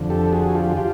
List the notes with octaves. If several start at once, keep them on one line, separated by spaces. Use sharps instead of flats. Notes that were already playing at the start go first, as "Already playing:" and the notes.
Already playing: F2 D3
G4 A4
F#4 G#4
F4 G4
F4 G4